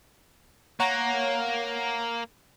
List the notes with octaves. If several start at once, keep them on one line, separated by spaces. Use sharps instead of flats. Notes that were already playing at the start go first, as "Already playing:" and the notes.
A#3 C#5 F#5 A#5